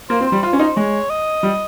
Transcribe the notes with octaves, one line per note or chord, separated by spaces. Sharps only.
A#3 C5
C4
C5
G3
F4 C5
C#4
D#4 C5
G#3 C#5
D#5
G3